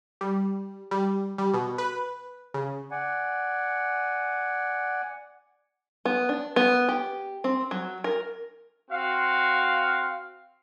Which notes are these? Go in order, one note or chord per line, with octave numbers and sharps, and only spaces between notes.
G3
G3
G3
B2
B4
C#3
D5 F#5 G#5
B3
D4
B3
G4
C4
F#3
A#4
C4 F#4 F5